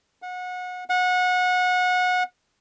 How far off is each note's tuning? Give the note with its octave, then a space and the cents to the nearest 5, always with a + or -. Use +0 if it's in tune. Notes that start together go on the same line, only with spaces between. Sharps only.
F#5 -30
F#5 -25